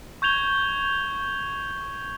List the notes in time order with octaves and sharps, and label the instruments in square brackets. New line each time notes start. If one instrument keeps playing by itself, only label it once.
[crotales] C#6 G6 G#6 F7 G7